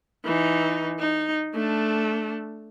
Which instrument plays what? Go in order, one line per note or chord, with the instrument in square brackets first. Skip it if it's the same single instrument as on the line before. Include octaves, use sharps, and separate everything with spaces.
[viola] E3 D#4
D#4
A3 D4